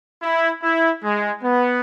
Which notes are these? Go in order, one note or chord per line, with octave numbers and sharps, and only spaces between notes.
E4
E4
G#3
B3